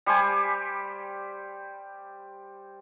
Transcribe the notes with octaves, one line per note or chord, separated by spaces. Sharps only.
G3 G4 C5 G#5